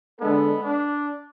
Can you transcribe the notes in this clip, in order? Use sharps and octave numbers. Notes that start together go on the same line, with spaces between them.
D3 G#3 B3 D4 A4
D4